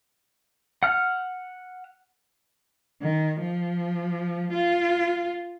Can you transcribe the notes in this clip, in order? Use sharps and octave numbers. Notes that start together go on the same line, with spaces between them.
F#5 F6
D#3
F3
F4